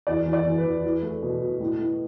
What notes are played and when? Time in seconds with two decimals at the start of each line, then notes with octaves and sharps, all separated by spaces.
0.07 E2 D5
0.26 E2
0.33 D5
0.46 E2
0.58 B4
0.64 E2
0.83 E2
1.03 A3
1.22 B2
1.41 B2
1.60 A2
1.79 A2